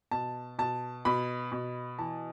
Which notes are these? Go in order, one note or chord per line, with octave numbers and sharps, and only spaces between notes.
B2 A5
B2 A5
B2 B5
B2
E3 A5